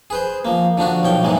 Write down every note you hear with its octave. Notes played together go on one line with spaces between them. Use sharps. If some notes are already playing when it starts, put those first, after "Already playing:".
G#4 B4 C5
F3 A#3
D3 F3 D4 F#4
B1 F3 C#5 G5
G#2 E3 F#3 G#3 A#3